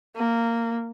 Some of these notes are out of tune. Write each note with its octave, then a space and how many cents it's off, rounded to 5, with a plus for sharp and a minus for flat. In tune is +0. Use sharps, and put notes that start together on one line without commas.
A#3 -15